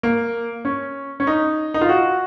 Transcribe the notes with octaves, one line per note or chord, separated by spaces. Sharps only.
A#3
C#4
C#4
D#4
D#4
F4
F#4